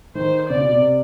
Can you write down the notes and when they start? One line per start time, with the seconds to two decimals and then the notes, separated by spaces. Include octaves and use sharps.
0.15 D#3 C5
0.50 C#3 D5
0.61 B2
0.72 C3